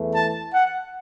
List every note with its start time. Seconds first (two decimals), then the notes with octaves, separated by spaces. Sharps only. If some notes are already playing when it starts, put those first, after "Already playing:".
Already playing: E2 E3 A3
0.15 A5
0.54 F#5